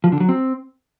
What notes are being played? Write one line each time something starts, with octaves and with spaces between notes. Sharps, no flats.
F3
D3
F#3
C4